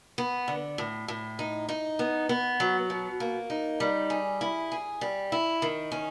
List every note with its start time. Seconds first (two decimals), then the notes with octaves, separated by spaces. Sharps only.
0.18 B3
0.48 D3
0.78 A2
1.08 A2
1.39 D#4
1.69 D#4
1.99 B3
2.29 B3
2.60 F#3
2.90 B2
3.20 A#3
3.50 D#4
3.80 G3
4.10 G#4
4.41 E4
4.72 G#4
5.01 G3
5.32 E4
5.62 D#3
5.92 C#4